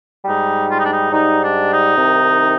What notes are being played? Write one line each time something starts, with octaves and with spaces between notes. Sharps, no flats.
G#2 G3 D#4
F4
D#4
D4
D#4
G#2 G3 D#4
D4
D#4
C2 C3 D#3